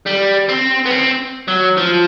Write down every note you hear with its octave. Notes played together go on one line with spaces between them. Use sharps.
G3
C4
B3
C4
F#3
F3